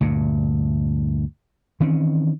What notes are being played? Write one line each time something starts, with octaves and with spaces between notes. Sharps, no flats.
D2 G2 A#2
D#3 E3 C4 C#4